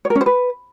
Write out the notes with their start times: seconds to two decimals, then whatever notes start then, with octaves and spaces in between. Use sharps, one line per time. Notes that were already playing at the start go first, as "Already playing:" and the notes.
0.05 C#5
0.10 A#4
0.15 C#4
0.21 C5
0.26 B4